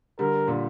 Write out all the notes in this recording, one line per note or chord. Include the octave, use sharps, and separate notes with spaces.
D3 G3 A#4
A#2 D3